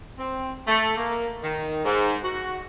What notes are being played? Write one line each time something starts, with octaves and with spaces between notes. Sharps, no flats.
C4
A3
A#3
D#3
G#2
F#4